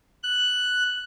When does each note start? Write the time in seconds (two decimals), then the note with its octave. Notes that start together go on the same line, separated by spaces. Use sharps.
0.23 F#6